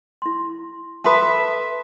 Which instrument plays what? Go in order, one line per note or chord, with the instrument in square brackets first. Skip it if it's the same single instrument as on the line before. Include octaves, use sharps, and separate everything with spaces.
[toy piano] E4 C6
[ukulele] A4 B4 [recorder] E5 [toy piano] A5 C6 D#6